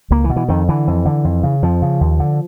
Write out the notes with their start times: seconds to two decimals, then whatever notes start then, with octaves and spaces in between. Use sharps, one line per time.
0.10 C#2 A#3
0.24 E3
0.30 B2
0.36 E3
0.48 F2 D#3
0.69 D3 E3
0.87 F2
1.06 D3
1.24 F2
1.43 C#3
1.62 F2 F3
1.82 C#3
2.01 D#2
2.20 D3